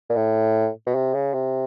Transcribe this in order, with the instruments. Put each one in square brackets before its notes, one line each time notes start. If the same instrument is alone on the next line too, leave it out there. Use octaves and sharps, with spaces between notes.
[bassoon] A#2
A2
B2
C3
C#3
C3